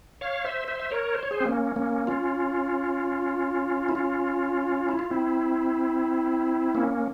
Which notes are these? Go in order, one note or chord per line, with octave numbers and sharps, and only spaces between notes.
C#5 F5
C5 E5
C5 E5
E5
A#4 C#5
C5
C#5
G#4 C5
C4
A#3 C#4
A#3 C#4
C#4 F4
E4
C#4 F4
E4
F4
C4 E4
A#3 C#4